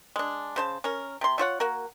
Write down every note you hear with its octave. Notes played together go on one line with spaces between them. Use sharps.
G#3 D4
C#3 C5 A5
C#4 A#4
C3 C6
A3 F4 C#5 F#5
A#3 F#4 A#4